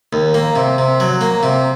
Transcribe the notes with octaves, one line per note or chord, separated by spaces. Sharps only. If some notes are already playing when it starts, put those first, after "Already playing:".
D#2
A#3
C3
C3
F#3
A#3
C3